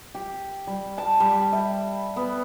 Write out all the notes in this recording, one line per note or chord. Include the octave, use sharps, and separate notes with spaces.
G4
G3
A5
G3
E5
B3